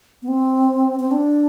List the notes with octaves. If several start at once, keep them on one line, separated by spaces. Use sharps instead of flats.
B3
C4
C4
D4